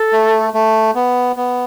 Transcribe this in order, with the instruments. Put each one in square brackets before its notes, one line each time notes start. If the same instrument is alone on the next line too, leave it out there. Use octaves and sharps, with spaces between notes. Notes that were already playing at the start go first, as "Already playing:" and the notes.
Already playing: [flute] A4
[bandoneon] A3
A3
B3
B3